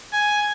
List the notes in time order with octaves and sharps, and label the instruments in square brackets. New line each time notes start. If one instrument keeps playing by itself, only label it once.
[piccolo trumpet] G#5